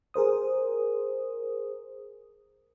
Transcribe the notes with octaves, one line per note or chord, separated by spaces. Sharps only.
G#4 A#4 C5 D#6